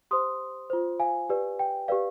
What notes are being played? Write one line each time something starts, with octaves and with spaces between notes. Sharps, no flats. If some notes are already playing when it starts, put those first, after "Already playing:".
G4 C5 C6 D#6
F4 C5
F5 G#5
G4 B4 D5
G5
G4 B4 D5 F5